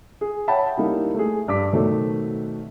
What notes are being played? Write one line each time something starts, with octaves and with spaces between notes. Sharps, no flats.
G#4
C#5 E5 F#5 G5 A5 B5
G3 A#3 D#4 E4
A3 G#4
G2 D6 B6
B2 D#3 F#3 A3 C4